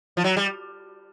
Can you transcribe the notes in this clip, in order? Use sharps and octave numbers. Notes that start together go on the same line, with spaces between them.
F3
F#3
G3